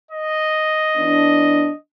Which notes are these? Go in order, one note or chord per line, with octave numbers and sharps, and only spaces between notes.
D#5
E3 B3 D4